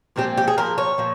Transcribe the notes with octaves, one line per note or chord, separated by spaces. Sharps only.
A#2 F3 G#3 C4 G4
G4
G#4
A#2 F3 G#3 A#4
C#5
A#2 F3